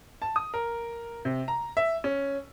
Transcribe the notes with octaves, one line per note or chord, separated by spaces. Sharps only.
A5
D#6
A#4
C3
A#5
E5
C#4